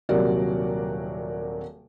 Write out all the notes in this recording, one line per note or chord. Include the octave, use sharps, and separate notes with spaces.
D#1 C3 F#3 F#4 A#4 D5